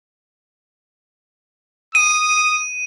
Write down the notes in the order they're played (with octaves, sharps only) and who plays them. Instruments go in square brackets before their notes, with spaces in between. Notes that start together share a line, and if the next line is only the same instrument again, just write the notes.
[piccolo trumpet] D#6 [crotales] D#7